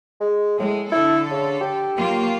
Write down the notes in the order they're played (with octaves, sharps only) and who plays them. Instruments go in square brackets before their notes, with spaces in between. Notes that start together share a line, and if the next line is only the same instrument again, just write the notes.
[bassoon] G#3
[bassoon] A2 [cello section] G#3
[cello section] D3 A4 [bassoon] E4
[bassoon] C#3
G4
[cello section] F#3 A#3 F4